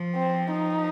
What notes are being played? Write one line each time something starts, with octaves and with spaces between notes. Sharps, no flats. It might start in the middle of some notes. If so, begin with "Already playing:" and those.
Already playing: F3
C4
D#4